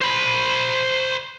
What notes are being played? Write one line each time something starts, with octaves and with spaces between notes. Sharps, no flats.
C5 B5